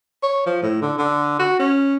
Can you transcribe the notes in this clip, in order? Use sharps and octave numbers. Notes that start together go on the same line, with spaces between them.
C#5
F3
A2
D3
D3
F#4
C#4